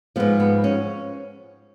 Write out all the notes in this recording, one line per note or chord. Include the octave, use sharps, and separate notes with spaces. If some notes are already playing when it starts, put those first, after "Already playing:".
G#2 F3 B3
B3
C#4